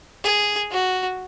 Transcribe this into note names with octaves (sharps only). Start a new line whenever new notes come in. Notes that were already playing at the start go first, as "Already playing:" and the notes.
G#4
F#4